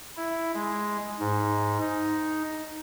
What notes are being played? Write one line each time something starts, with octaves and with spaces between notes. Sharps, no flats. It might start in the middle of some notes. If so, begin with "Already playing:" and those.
E4
G#3
G#2
D#4